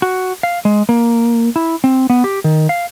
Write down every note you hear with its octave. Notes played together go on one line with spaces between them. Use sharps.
F#4
F5
G#3
A#3
E4
C4
B3
G4
D#3
F5